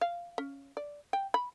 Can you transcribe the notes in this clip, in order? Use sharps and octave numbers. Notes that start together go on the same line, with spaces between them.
F5
C#4
D5
G5
B5